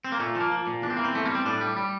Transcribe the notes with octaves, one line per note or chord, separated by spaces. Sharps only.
C4
A#3
A#2 A3
F3 A#3
F3
A#2
E2 D4
C4
E3 A#3
C4
E2 A3
A#3
G3
C4
A2 D4
G3
G3